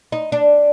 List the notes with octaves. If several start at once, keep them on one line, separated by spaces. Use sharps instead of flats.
D#4
D4